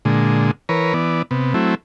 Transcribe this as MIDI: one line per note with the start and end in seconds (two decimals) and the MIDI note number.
0.05 0.51 46
0.05 0.51 50
0.05 0.51 56
0.69 0.93 52
0.69 0.93 70
0.69 0.93 71
0.69 0.93 73
0.94 1.22 52
0.94 1.22 59
0.94 1.22 74
1.31 1.53 48
1.31 1.53 59
1.54 1.75 54
1.54 1.75 57
1.54 1.75 60
1.54 1.75 64